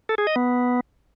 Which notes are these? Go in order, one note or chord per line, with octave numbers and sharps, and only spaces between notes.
A4
G#4
D#5
B3